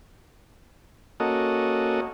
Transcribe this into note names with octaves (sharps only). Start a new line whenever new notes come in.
A#3 C#4 F#4 A4 D#5